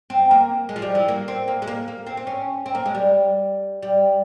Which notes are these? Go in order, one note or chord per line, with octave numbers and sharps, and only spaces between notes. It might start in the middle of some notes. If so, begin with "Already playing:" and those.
C4
A#3
G#3
F3
G3
E3
A#3
C4
A#3
G#3
A#3
A#3
C4
C4
C#4
C4
A#3
G#3
G3
G3